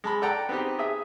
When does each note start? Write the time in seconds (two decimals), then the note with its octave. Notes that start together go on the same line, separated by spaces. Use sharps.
0.04 G#3 A5 B5
0.22 A4 D5 F#5 G5 A5 A#5
0.49 B3 C4 D#4 G4
0.79 G#4 E5